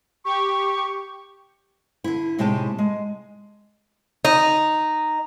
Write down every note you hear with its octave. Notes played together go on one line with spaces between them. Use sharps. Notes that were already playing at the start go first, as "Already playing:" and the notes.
G4 C#6
D3 E4
A2 C3 G#3 D#4 G4 A5
G#3
D#4